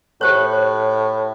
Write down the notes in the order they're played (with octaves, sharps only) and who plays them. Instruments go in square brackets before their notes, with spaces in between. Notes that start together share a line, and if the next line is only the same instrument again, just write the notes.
[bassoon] A2 [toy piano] G4 C5 C#5